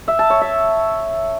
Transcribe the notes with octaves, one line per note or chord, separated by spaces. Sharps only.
E5
A5
C#5
E5